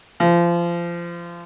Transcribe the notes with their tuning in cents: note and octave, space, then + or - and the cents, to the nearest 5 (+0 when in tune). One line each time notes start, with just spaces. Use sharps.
F3 -25